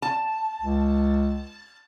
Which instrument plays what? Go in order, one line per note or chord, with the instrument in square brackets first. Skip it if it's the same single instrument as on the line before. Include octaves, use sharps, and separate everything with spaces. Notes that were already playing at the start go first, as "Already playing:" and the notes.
[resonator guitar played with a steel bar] A5
[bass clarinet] C#2